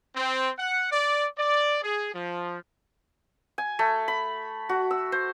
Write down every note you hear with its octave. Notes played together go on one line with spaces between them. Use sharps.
C4
F#5
D5
D5
G#4
F3
G#5
A3
B5
F#4
E6
C5